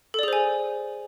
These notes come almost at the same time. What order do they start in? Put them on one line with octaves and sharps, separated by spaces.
A4 D5 G#4 C5 G#5